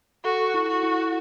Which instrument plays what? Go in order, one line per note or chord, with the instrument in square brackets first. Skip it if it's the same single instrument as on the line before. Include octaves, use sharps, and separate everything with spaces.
[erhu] F#4 [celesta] A4
[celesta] E4
[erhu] F#4
[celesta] E4